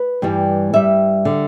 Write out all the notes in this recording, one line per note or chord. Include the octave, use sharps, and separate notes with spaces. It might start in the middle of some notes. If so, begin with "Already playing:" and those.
Already playing: B4
G2 E3 G3
G2 G3 E5
D3 G3